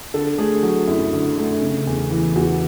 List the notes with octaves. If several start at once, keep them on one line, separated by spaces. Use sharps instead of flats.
D3 A4
A3 G#4
F#3
F#2 E4
D3
A3
C#3
E2
E3
E2 F#4